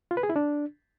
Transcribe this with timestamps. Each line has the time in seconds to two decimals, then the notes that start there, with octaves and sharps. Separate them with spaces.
0.11 F4
0.17 B4
0.23 G#4
0.29 E4
0.36 D4